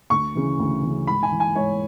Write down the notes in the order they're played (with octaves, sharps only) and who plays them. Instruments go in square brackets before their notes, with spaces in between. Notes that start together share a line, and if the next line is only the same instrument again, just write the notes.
[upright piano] D2 C#6
C#3 E3
D2
C#3 E3
G#2 B5
G#5
E3
G#5
G#2 C#5